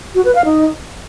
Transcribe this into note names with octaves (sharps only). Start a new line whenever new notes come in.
F#4
B4
F5
D#4